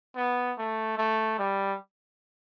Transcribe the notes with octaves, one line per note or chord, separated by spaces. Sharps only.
B3
A3
A3
G3